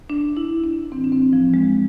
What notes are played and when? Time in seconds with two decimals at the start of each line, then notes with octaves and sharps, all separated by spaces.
0.10 D4
0.37 E4
0.64 D4
0.91 A2 E3 C4
1.04 D4
1.12 C4
1.33 F3
1.54 G#3